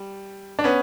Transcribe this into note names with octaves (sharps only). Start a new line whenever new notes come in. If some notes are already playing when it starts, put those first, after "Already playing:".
Already playing: G3
D4
B3 C#4